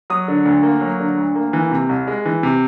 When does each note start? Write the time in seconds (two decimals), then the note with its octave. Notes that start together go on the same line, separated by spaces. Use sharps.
0.10 F#3 D#6
0.28 D3
0.46 D2
0.63 A#3
0.81 F#3
1.00 D3
1.18 D2
1.35 A#3
1.53 E3
1.71 C3
1.89 C2
2.07 G#3
2.25 E3
2.43 C3